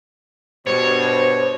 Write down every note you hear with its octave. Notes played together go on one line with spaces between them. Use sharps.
G2 B2 C5 C#5